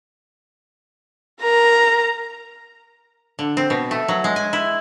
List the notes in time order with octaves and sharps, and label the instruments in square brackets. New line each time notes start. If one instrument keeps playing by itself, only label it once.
[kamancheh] A#4 A#5
[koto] D3
C4
B2
A3
F#3
G#3
G#5
E4